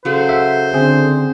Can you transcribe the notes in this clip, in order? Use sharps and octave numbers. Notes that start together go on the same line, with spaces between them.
C#3 F#3 A4 C5
E5 F#5
D3 C4 G#4